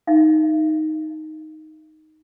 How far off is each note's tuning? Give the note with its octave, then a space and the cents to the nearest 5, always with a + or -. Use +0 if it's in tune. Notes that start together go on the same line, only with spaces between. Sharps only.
D#4 +0 E5 +45